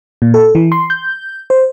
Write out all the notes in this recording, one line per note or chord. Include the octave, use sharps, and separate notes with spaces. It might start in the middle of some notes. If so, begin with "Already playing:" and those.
A#2
A4
E3
C6
G6
C5